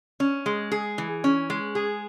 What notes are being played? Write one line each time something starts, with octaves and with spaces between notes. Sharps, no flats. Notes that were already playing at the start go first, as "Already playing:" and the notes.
C#4
G#3
G#4
E3
C#4
G#3
G#4